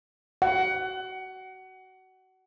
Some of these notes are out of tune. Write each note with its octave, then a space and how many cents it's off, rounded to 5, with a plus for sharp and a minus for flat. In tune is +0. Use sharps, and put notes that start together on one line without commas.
F#5 +25